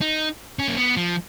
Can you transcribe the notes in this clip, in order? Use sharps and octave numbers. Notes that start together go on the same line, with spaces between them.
D#4
C#4
A#3
B3
F3